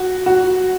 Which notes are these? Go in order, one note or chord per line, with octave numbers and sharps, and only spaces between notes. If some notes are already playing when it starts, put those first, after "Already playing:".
Already playing: F#4
F#4